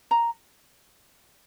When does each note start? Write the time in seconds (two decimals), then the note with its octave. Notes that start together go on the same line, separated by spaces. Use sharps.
0.11 A#5